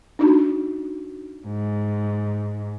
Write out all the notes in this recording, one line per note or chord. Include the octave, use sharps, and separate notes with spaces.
D4 D#4 F#4
G#2